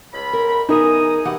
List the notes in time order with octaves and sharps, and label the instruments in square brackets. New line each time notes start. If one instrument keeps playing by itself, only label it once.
[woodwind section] C#2 B5
[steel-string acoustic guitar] A#4
[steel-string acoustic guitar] E2 A#4 E5 [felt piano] D#4 [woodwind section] G#4 D#6
[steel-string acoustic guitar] E3 G4 F#5